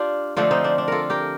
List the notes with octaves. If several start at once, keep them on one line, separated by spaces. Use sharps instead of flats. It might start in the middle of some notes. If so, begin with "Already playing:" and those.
Already playing: D4 F4 G4
D3 F3 A3 C4 D4 F4
C4 D#4
D4
D4
F4 A4 A#4
G4 A#4